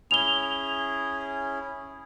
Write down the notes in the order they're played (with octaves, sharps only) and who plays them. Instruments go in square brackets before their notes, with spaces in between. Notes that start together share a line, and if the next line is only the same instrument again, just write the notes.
[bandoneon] C#4 E4 G#4 [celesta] F7 G7